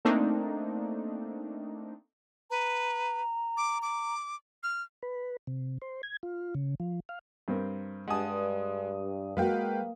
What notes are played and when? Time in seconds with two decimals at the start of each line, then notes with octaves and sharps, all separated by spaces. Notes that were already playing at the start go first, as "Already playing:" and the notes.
0.05 A3 A#3 C4 D4 D#4
2.51 B4 A#5
3.57 D6
3.82 D6
4.63 F6
5.03 B4
5.47 C3
5.82 C5
6.03 G#6
6.23 F4
6.55 C#3
6.80 F3
7.09 F5
7.48 G2 C4 A#4
8.08 G2 G#3 F#5 G#5 A5 D#6
9.37 G#3 A#3 F#4 B4 F5 G5